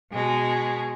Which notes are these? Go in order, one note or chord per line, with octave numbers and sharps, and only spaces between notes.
B2 G#3